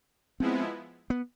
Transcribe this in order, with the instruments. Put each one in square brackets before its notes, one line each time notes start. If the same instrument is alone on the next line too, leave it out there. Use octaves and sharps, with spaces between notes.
[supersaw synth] F3 G#3 B3 E4 [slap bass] C4
[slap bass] B3